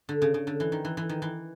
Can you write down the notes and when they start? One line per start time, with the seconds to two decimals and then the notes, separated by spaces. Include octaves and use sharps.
0.09 D3
0.22 C#3
0.34 C#3
0.47 D3
0.60 E3
0.72 D#3
0.85 E3
0.97 E3
1.09 D#3
1.22 E3